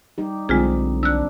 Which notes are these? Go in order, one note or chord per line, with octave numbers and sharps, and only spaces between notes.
G3 D#4 G4
B1 D3 G#3 C4 F4 G#4
D4 E6 F#6